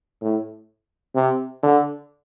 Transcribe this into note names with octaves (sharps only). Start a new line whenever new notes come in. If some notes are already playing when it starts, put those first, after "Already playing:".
A2
C3
D3